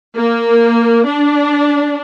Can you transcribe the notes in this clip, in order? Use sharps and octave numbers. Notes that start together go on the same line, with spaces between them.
A#3
D4